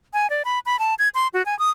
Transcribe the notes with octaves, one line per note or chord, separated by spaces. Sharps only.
G#5
D5
B5
B5
A5
G#6
C6
F#4
G#5
D#6